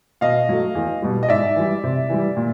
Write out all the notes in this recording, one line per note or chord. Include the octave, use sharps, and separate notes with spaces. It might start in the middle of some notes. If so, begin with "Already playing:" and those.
B2 D#5 F5
F#3 A3
E2
B2 G3
D#5
G#2 D5 E5
E3 G3
C3
E3 G3
A#2